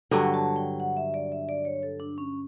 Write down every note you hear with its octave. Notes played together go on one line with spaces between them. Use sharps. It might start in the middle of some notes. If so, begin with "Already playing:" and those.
G2 D3 F#3 G5
A5
G5
F#5
E5
D5
E5
D5
C#5
A4
D4
C#4